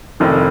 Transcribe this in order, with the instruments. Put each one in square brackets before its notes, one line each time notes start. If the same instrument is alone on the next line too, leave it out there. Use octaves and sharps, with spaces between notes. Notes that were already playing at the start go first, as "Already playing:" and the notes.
[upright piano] F1 F2 D#3